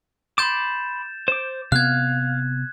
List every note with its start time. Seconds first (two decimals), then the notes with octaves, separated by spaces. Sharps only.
0.38 B5 C6 D6 G6 A6 E7
1.28 C5 D6
1.72 C3 B3 F5 F#6 G#6